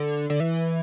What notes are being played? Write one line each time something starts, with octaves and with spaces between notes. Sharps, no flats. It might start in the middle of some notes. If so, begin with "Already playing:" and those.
Already playing: D3
D3
E3